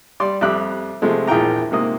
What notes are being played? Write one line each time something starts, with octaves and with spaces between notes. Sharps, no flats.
G3 D5 C6
F2 G3 E5 D6 F#6
C3 F3 G#3 A3
A#1 E2 E4 G#4 G5 A#5
G#2 C3 A#3 D#6